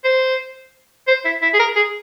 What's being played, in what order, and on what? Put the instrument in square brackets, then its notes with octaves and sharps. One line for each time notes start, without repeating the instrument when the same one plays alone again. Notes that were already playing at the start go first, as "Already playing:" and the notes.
[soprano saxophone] C5
C5
E4
E4
G#4
A#4
G#4